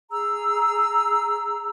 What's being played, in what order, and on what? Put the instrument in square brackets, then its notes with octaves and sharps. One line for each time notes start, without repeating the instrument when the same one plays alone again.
[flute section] G#4 A#5 E6